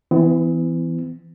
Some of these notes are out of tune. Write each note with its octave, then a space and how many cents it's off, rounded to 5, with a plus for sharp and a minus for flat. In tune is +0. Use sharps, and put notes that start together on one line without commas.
E3 +0 B3 +40